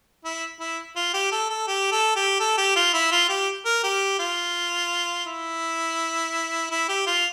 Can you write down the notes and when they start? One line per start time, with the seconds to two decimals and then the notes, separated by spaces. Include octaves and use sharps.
0.25 E4
0.60 E4
0.96 F4
1.14 G4
1.32 A4
1.50 A4
1.68 G4
1.91 A4
2.16 G4
2.40 A4
2.58 G4
2.76 F4
2.94 E4
3.12 F4
3.29 G4
3.66 A#4
3.84 G4
4.19 F4
5.27 E4
6.71 E4
6.89 G4
7.07 F4